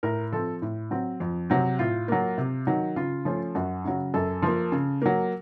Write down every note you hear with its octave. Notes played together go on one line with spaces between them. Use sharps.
A2 A#4
F3 C4 A4
A2
F#3 C4
F2
C3 F#3 C4
A2 F4
F#3 A#3
C3
D#3 F#3
C#3 F4
F3 A3 C#4
F#2 F#4
C#3 F#3
F#2 A4
F3 A#3
C#3
F#3 A#3